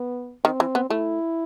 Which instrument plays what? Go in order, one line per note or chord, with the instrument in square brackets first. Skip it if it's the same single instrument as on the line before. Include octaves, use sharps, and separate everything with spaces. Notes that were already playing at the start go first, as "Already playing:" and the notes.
Already playing: [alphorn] B3
[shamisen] D#3 [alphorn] C4
[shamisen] E3
B3
[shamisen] A3 [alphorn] E4